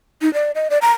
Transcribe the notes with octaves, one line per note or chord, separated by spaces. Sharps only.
D#4
D5
D#5
D5
A#5